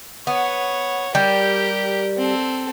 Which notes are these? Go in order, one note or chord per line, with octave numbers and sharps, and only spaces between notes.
B3 C#5 F#5
G3 G4 A#4
C4 A4